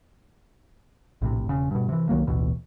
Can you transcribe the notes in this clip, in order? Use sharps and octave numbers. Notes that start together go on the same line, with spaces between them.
A#1 A2 C3
E1 C#3
G2 B2
C3 E3
C2 D#3 F#3 A#3
A1 D2 B2 E3